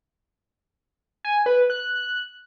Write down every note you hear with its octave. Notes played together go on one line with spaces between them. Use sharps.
G#5
B4
F#6